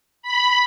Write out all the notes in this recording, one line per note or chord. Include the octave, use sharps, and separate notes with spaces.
B5